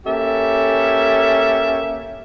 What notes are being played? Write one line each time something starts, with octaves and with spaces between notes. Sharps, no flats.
A#3 C#4 G4 A4 E5